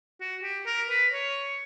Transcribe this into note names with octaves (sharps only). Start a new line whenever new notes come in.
F#4
G4
A#4
B4
C#5